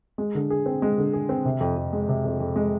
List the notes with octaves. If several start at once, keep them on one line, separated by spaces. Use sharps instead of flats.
G#3
D3
G#4
C4
G#3
D3
G#4
C4
C3
F2
F2
G#3
C3
F2
F2
G#3